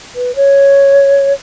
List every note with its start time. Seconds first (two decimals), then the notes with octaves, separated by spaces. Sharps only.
0.15 B4
0.36 C#5